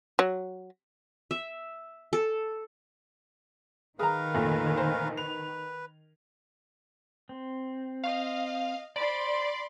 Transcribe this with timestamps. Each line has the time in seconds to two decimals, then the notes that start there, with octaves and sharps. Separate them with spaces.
0.19 F#3
1.31 E5
2.13 A4
3.99 D#3 G#4 A#4 B4 F5 A#5
4.34 F1 A#2 A3
4.77 C5
5.17 B4 F7
7.29 C4
8.04 D#5 F5
8.96 C5 D5 B5 C6